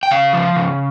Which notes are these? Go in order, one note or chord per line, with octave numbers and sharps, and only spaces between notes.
G5
C#3 F5
F3
C#3